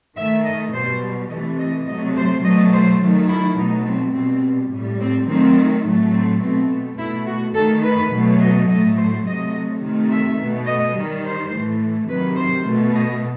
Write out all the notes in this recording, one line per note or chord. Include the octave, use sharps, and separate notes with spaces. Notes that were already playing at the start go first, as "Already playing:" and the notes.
D#3 A3 E5
D#5
B2 G3 C5
C3 E3 A3 D#5
D#5
C3 F#3 A3 D#5
C5
B2 F#3 A3 D#5
C5
D#3 F#3 A3
E4
B2 F#3 A3 D#4
C4
B2 G3 C4
A2 G3
C4
D#3 F#3 A3 C4
A2 F#3 A3
C4
B2 A3 C4
B2 A3 E4
F#4
D#3 A3 A4
B4
B2 F#3 A3
D#5
A2 F#3 A3 D#5
C5
C3 F#3 A3 D#5
C3 D#3 A3
E5
B2 A3
D#5
D#3 G3
C5
A2 E3 A3
C3 D#3 F#3 B4
C5
B2 A3
D#5